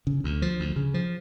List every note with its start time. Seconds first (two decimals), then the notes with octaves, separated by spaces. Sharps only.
0.07 C#3
0.24 D2
0.42 F3
0.60 D2
0.76 C#3
0.94 F3